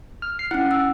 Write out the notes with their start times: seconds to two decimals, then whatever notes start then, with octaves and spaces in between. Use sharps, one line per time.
0.22 F6
0.39 C7
0.51 C#4 E4 F#5
0.71 E6